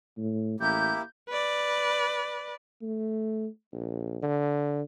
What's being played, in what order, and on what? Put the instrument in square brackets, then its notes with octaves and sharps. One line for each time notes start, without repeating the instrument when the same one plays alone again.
[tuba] A2
[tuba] A1 [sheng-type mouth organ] A#3 E4 G4 [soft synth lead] G6
[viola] B4 D5
[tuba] A3
A#1
D3